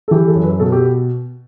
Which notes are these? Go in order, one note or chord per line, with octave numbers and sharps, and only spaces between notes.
A4
E3 G4
A4
F#2
B4
B2 A4
G4